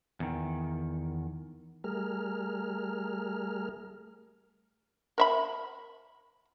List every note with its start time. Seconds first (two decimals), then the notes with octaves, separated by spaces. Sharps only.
0.20 E2 D#3
1.84 G3 A3 G#4 A#4 F6
5.18 A#4 E5 B5